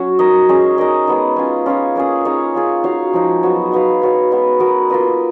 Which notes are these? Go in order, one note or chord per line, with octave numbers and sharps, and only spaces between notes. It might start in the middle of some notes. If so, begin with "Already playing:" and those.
Already playing: F#3 C#4 F#4
D#4 A#4 D#5
G#3 C#4 G#4
D#4 A#4 D#5
G#3 B3 D#4
C#4 F4 G#4
C#4 F4 G#4 C#5
A#3 C#4 G#4
D#4 G#4 C#5 F5
C#4 F4 G#4
D#4 F#4 C#5 F5
F3 G#3 D#4
F#3 B3 F#4
D#4 F#4 B4 F5
B3 F#4 C#5 F5
G#3 B3 F#4
B3 F#4 A#4 D#5
A#3 F4 B4 D#5